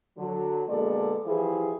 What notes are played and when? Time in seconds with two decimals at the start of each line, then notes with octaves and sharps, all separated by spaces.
0.18 D3 F#3
0.69 B2 D3 G#3 A#3 A4 D5
1.25 E3 F3 G3 E4 G#4